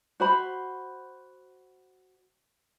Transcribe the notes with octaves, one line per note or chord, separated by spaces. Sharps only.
F#4 C5 B5